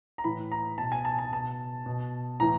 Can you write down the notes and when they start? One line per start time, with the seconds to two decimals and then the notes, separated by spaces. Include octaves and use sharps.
0.18 A#5
0.24 A2 E3 B5
0.51 A#5
0.78 B2 A5
0.92 G#5
1.05 A5
1.19 A5
1.32 B2 A5
1.86 B2
2.40 A2 E3 A#5